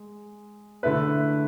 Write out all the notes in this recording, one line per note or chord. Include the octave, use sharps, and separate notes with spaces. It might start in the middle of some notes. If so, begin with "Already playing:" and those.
Already playing: G#3
D3 A3 E4 B4